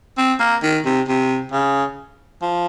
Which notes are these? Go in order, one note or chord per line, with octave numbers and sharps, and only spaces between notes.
C4
A#3
D#3
C3
C3
C#3
F3